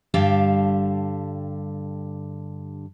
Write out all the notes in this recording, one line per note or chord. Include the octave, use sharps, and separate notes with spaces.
G2 D3 G4 F5 A5